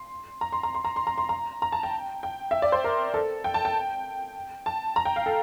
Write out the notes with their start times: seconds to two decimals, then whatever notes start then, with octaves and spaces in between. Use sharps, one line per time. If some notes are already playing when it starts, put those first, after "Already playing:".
Already playing: C6
0.41 A#5
0.52 C6
0.63 A#5
0.75 C6
0.85 A#5
0.96 C6
1.07 A#5
1.18 C6
1.29 A#5
1.62 A#5
1.72 A5
1.83 G5
2.23 G5
2.51 E5
2.62 D5
2.72 C5
2.84 A#4
3.14 A4
3.44 G5
3.54 A5
3.65 G5
4.66 A5
4.96 A#5
5.05 G5
5.16 F5
5.26 A4